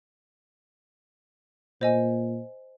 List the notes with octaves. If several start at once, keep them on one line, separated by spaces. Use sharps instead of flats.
A#2 C5 D#5 G#5